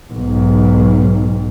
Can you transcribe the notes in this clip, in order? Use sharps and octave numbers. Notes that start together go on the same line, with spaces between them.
B1 G#2